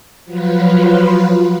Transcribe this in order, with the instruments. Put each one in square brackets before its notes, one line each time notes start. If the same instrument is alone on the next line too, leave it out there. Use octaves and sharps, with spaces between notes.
[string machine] F3 F#3 F4 B4